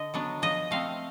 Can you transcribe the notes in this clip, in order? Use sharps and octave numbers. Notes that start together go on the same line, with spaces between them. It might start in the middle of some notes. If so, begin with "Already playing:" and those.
Already playing: D3 D#5
F#3 B3 D4
F3 D#5
A3 C4 F5